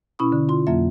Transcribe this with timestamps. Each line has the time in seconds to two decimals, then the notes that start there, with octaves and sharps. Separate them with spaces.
0.19 B2 C#4 E4 B5 C#6 D#6
0.32 D3
0.49 F4 C6
0.67 F2 F#3 A#3 F4 E5